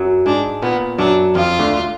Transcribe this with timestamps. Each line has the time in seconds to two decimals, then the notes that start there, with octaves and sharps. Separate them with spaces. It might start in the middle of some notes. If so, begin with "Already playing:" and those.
Already playing: F#2 F#3
0.26 G#2 G#3 D4
0.62 A#2 A#3 B3
0.98 F#2 F#3 D4
1.35 F2 F3 F4
1.59 D2 D3